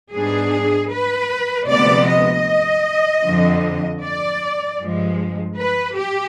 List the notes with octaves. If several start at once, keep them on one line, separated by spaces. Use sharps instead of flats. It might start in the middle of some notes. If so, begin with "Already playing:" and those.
G#2 G3 B3 D4 G#4
B4
D2 C3 F3 G#3 B3 D5
D#5
F2 D3 F3
D5
G2 F3 G#3
B4
G4